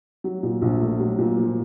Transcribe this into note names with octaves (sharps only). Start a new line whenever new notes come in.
F#3
A#2
A#1
A3
F#3
A#2
F3